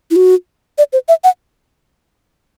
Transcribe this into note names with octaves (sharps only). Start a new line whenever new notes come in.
E4
F#4
D5
C5
E5
F#5